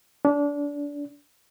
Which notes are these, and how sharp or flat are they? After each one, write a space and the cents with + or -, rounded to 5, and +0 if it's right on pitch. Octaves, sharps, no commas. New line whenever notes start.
D4 -25